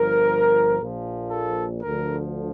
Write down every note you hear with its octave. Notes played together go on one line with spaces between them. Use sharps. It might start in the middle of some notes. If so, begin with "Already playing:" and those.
Already playing: G1 G2 F3 A#4
A#1 A#2 F3
A4
D2 D3 F3 A#4